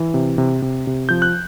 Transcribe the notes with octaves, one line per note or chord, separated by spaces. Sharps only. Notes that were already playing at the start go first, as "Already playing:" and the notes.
Already playing: E3
C3
C3
C3
C3
F3 G6
F#6